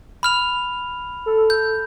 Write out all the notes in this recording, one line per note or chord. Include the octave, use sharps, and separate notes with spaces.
B5 F6 F7
A4
G6